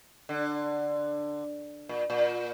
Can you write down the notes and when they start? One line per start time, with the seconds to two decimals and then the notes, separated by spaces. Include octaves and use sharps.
0.29 D3
1.89 A#2
2.10 A#2